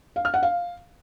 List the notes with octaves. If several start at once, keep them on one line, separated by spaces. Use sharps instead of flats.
F5
F6
F#5
F5